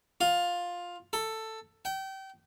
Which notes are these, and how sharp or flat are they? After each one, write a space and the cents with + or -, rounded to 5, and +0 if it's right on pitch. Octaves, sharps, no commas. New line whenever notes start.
F4 +10
A4 +10
G5 -30